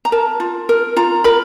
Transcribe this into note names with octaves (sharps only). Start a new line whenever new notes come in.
A#5
A#4 A5
F4
A#4
F4 A#5
A#4 B5